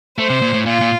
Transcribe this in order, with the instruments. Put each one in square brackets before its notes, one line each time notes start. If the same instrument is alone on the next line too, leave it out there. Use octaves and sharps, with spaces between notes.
[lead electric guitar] A3 [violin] C5
[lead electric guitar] C3
A#2
A2
[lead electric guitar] A#2 [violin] F4
[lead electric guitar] A#2